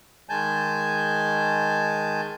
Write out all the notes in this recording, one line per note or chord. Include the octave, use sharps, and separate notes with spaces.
D#3 G#3 G#5 A5 G6